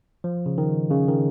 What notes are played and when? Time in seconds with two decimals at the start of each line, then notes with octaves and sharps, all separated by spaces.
0.24 F3
0.46 C#3
0.58 D#3
0.91 C#3
1.08 D#3